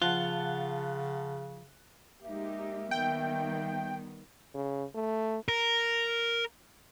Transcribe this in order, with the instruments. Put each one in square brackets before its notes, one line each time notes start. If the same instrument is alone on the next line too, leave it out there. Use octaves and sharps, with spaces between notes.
[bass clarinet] C#3 [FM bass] F3 [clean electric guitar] F4 [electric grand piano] F#5 A5 F#6
[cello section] G#3 D#4 G4 [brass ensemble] A#3 E5
[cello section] D#3 G3 B3 [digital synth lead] G5
[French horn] C#3
A3
[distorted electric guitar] A#4